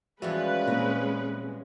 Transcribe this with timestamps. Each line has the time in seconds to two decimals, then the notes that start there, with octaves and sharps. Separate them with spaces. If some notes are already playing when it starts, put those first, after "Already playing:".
0.22 E2 F3 G3 G#3 C#4 F#4 B4 E5
0.67 A#2 C4 A#5